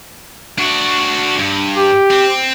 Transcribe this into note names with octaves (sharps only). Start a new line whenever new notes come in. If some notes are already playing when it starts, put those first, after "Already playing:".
D4 F#4
G2
G4
C4